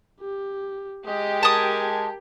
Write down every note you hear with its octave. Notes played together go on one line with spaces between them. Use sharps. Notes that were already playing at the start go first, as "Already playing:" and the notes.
G4
G#3 G4 D#5
A#4 A5 D#6 G#6